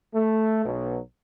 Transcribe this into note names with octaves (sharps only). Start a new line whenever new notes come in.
A3
B1 B2 F#3